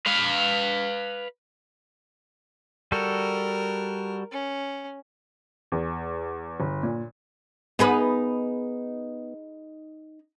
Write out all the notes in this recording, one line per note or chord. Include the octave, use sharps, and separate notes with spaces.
B4 F5
G3 F#4 A4 A#4
C#4
E2
G1
A#2
B3 D#4 G#4 B4